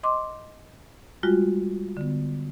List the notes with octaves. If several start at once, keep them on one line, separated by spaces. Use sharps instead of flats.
D#5 C6 D6
G3 G#3 F4 F#4
D3 B3